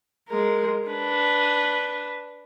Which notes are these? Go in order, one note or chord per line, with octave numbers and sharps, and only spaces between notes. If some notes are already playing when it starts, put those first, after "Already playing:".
G#3 A#4
D4 B4